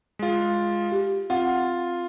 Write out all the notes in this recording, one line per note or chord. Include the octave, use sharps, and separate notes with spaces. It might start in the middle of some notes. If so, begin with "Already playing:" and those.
G#3 F4
G4
C4 F4 F#5